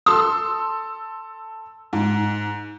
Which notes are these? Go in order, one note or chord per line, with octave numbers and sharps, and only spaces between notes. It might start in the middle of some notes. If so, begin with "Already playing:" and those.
A4 C6 E6
G#2